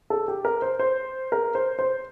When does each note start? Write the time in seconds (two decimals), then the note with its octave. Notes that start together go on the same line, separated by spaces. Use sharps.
0.10 A4
0.28 G4
0.45 A#4
0.62 C5
0.79 C5
1.32 A#4
1.55 C5
1.79 C5